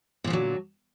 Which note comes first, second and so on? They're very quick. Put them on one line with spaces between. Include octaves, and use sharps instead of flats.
A#2 F3 D3 F#3